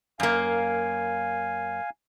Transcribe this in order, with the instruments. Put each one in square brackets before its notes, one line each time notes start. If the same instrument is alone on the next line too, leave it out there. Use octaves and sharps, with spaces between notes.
[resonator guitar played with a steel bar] F#2 A#3 [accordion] F5 G#5